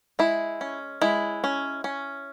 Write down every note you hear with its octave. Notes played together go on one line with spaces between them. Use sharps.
G#3 E4
C#4
G#3 E4
C#4
C#4